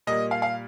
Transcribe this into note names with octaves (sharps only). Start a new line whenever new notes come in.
A#2 G3 A#3 D#5
F5
F5